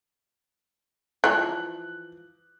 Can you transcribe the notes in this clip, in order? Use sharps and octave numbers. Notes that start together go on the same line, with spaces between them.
E3 F3 F#6